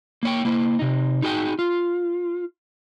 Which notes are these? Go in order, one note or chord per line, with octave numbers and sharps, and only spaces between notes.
A#3 C#5 G5
A#3 E4 C5
C3 D#4
D#4 F#4 G#4 G5
F4